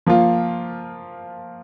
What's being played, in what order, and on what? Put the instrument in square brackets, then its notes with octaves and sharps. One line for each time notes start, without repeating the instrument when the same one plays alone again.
[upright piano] F3 A#3 F4